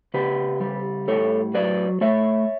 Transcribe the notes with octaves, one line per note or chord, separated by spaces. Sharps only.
C#3 G4 B4
G3
A2 A4 C#5
F#3 B4 D5
A3 C#5 E5